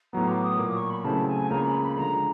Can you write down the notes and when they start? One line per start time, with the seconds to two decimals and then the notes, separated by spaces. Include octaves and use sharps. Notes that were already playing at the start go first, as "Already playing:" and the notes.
0.13 A2 F#3 B3 A#5
0.28 D6
0.44 D#6
0.59 A#2 F#3 A#3 D6
0.75 C#6
0.90 B5
1.04 C#3 F#3 A3 C4 E4 A5
1.28 G#5
1.50 C#2 C#3 F3 A#3 A#5
1.66 B5
1.81 B5
1.96 D3 F3 G#3 A#5